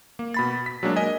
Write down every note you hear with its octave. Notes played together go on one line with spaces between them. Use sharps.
A#3
B2 B5 A6
B6
F#3 G#3 A#3 D4
A#4 D#5 G#5